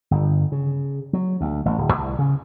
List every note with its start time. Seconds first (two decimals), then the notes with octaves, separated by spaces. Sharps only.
0.11 G1
0.52 C#3
1.13 F#3
1.41 D2
1.65 A1
1.78 D1
1.92 C2
2.19 C#3